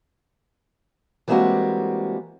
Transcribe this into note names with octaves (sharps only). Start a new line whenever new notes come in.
E3 G3 G#3 A#3 C4 F#4